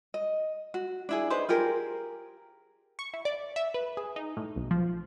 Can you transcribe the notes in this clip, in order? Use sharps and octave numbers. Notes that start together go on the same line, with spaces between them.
D#5
F#4
D4 E4 G#4
D4 D#4 B4 C5
F4 G4 G#4 A#4
C#6
E4
D5
E5
B4
G#4
D#4
A2
B1
F3